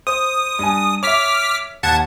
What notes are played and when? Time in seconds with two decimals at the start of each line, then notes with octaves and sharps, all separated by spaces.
0.07 C5 D#6
0.59 G2 G#5
1.03 C#5 E5 D6 F6 B6
1.83 D#2 F#5 A5 G#6